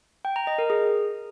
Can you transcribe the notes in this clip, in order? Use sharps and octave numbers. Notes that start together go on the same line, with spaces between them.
G5
A#5
D#5
A#4
G#4